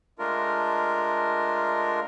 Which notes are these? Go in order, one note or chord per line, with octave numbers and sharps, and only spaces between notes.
G#3 A3 D4 F4 A#4